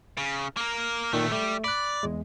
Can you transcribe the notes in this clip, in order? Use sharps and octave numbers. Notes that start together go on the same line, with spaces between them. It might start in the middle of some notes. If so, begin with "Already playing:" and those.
C#3
A#3 A#4
F#2 A#2 D#3 A3
G3 A3
D5 B5 F#6
E2 G#3